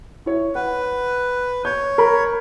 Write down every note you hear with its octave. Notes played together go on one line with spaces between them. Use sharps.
E4 C#5
B4 F#5
C#5 G6
A#4 B5